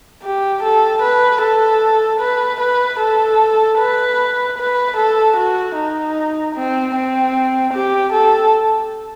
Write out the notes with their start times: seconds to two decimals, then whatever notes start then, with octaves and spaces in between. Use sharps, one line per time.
0.23 G4
0.63 A4
1.02 B4
1.42 A4
2.21 B4
2.60 B4
3.00 A4
3.79 B4
4.58 B4
4.97 A4
5.37 F#4
5.76 D#4
6.55 C4
6.95 C4
7.74 G4
8.13 A4